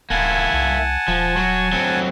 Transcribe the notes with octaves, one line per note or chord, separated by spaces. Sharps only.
D1 A#3 E4 F#5 G#5 A5
C2
D#1 F3
F#3
F#3 C4